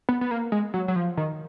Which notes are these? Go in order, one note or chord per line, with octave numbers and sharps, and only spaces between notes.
B3
B3
A#3
G#3
F#3
F#3
F3
D#3